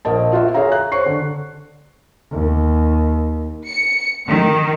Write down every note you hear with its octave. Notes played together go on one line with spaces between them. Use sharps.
A#1 A#4 D#5 A5
F4 F#4 E5
G#4 C#5 E5 F5 A#5
F#6
C5 C#5 C#6 C7
D3
D#2
C#7
D#3